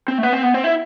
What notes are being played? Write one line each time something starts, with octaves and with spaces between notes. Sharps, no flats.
C4
A3
B3
C4
B3
C4
E4